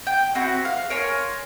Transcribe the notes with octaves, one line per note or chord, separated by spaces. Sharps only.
G5
C4 E4 F#4
F5
A#4 C#5 G#5 C6